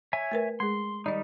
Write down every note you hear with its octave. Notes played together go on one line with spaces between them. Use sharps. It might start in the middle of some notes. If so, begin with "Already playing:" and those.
C#5 E5 G#5
A3 A#4 B4
G#3 G#4 C6
D#3 G3 D#4 D5 D#5